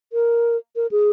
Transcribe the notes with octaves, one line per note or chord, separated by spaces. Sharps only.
A#4
A#4
G#4